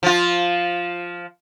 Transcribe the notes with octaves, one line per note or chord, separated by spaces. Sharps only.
F3 F4